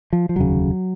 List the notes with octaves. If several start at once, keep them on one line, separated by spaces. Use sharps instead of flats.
F3
F3
F1 D#2 C#3 F#3